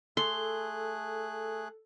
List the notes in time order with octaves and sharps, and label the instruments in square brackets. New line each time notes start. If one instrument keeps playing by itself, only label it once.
[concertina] A3 G#4 F#6 [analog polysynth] A4 [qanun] C6